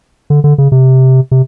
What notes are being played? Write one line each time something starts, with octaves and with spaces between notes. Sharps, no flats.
D3
D3
C#3
C3
C3